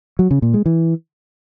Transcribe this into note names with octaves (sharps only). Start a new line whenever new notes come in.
F#3
C#3
A#2
G#3
E3